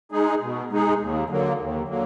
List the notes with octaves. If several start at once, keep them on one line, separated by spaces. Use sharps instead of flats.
G#3 D#4 G#4
B2
G#3 D#4 G#4
D#2
D3 F#3 A#3
D#2
D3 F#3 A#3